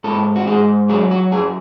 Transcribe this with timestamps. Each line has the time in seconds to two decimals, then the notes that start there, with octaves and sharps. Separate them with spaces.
0.04 G#2 A4
0.36 F#4
0.47 G#2 G#4
0.89 F#3 G#4
1.11 F#4
1.32 F#2 G#4